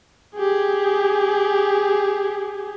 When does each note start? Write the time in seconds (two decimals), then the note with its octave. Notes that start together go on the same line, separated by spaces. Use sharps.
0.37 G4 G#4